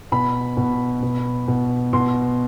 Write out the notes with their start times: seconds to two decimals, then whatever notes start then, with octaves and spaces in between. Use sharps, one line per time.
0.12 B2 B5
0.57 B2
1.03 B2
1.48 B2
1.93 B2 C6